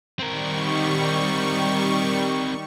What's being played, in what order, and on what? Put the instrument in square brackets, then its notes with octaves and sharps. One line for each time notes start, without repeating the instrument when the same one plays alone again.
[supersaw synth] D#3 G3 C#6 [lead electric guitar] C4 A#4